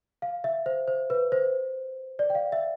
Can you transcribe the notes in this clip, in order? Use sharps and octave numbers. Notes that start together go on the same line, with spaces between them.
F5
E5
C5
C5
B4
C5
D5
G5
F5
E5